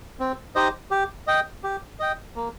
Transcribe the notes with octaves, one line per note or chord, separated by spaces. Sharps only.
C4
D#4 G4 C5 D#5
G4
D#5 G5
G4
D#5 G5
A#3